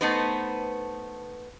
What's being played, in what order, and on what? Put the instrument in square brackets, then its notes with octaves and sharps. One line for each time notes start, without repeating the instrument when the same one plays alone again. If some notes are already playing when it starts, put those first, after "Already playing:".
[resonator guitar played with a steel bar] A3 B3 D#4 B4 C5